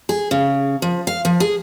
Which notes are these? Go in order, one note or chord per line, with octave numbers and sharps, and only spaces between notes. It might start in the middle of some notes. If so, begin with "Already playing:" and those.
G#4
C#3
F3
F5
F3
G#4